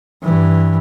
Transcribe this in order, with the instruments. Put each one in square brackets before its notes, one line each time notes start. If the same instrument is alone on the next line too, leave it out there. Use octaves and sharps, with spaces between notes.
[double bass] G2 E3